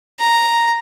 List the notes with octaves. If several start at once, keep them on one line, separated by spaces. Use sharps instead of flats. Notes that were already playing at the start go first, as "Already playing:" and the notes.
A#5